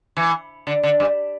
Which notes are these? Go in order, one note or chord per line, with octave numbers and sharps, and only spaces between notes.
E3
D3
D3
G2